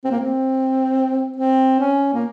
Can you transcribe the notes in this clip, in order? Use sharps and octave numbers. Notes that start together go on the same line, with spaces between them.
C4
A#3
C4
C4
C#4
A#3